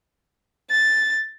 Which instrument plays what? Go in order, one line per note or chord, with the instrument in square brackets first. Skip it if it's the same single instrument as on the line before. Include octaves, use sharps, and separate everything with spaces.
[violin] A6